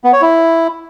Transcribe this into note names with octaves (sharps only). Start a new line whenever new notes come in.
B3
C#5
E4